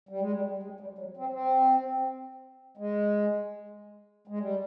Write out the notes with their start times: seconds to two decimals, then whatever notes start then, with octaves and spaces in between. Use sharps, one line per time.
0.09 G3
0.20 G#3
0.32 G3
0.63 G#3
0.80 G3
0.99 F#3
1.17 C4
1.32 C4
2.77 G#3
4.27 G#3
4.39 G3